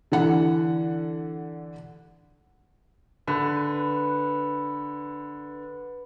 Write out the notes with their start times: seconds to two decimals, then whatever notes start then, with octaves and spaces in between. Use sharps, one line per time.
0.12 D3 E3 F#5
3.27 D3 B4